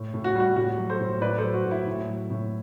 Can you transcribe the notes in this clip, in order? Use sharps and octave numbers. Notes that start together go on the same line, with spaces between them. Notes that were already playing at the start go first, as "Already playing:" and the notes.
Already playing: A2
A2
F#4
G3 F#4
A2 F#4
F#3
A4 C5
A2
A2 B4 D5
A4 C5
F#3
F#4
A2
E4
A2
F#3
A2